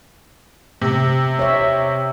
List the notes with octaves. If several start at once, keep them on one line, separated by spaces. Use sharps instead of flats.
C3
C#5 E5